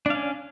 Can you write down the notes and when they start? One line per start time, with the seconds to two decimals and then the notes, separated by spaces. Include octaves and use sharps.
0.06 D4
0.10 F5
0.15 C#4